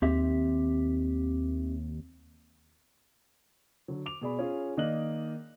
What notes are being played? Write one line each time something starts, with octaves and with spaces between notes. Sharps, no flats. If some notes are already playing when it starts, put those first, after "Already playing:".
D#2 C4 G4 E5
D3 F#3
D6 F7
B2 G#4 D5 B5
C#4 F4 G#4 C#5
D#3 A#3 D5 D#5 F#6 F#7